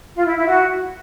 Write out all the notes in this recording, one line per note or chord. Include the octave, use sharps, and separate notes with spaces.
F4
E4
E4
F#4